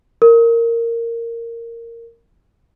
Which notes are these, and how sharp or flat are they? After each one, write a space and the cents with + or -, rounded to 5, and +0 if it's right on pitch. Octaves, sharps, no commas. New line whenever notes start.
A#4 -10